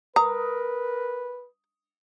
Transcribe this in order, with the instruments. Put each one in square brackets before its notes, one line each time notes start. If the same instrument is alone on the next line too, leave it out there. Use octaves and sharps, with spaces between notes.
[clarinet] A#4 [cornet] B4 [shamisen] A#5 [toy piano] D#6